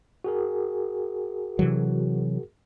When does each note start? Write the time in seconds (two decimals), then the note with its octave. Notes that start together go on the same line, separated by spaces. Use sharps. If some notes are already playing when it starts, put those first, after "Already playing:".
0.24 F#4 G#4 A#4
1.59 C3 E3 F#3